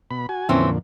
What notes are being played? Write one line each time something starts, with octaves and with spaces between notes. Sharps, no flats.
B2 B5
F#4 G#5
F2 A#2 D3 E3 C4 C#4